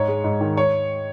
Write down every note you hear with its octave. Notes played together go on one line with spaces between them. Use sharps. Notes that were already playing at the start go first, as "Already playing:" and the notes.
Already playing: G#2 C#5
G#3
G#2
D#3
C#5